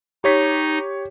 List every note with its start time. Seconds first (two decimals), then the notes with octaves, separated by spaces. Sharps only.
0.24 D#4 G4 C#5 B6